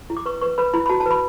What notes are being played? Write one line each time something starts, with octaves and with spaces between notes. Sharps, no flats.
E4
D6
B4 C#6
B4 C#6
B4 B5
E4 B5
B5
F#4 A5
A5
B4 B5